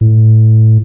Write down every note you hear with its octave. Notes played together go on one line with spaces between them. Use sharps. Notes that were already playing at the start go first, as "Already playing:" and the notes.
A2